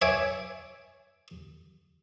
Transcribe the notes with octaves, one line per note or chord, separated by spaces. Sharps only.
C#5 E5 G#5 D6